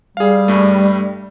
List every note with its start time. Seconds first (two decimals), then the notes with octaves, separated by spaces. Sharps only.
0.17 G3 G#4 F5
0.48 G2 A3